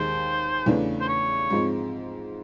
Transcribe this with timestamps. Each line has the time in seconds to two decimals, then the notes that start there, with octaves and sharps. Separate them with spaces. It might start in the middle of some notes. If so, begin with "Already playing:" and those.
Already playing: D#2 D#3 G#3 C5
0.66 E2 C#3 E3 A3 D4
1.01 C5
1.08 C#5
1.50 G#2 F3 G#3 C4